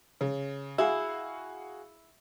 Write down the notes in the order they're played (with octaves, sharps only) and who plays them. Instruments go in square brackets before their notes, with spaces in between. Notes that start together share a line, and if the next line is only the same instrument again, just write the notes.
[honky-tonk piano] C#3
[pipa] E4 [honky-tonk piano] F#4 G#4 F5